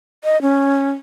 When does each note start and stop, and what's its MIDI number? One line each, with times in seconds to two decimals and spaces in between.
0.24 0.40 75
0.42 0.91 61